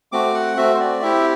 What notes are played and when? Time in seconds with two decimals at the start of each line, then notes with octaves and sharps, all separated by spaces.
0.12 A3 C4 F#4 D6
0.34 F#5
0.57 A3 C4 F#4 E5
0.75 C5
0.80 D5
1.02 C4 E4 G4 E5